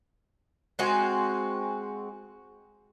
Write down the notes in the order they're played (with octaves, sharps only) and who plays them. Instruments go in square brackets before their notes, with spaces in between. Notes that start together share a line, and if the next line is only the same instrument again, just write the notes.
[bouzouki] G#3 C4 F#4 G#5